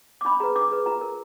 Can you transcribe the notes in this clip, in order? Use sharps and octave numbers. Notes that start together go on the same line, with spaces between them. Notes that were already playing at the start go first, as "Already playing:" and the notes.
D6
D4 B5
G#4 B4 A#5
D4 D6
G#4 B4
F4 A#5
A#4